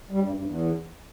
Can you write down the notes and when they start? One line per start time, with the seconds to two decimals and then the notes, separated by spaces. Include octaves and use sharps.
0.11 G3
0.22 G2
0.33 G2
0.44 E2